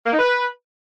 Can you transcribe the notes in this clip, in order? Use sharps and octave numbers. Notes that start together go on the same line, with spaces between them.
A#3
D#4
B4